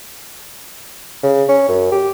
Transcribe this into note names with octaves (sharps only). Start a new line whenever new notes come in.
C#3
C#4
F#2
G4